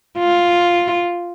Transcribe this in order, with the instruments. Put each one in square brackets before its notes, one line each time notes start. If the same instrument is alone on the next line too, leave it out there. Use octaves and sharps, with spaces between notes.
[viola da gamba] F4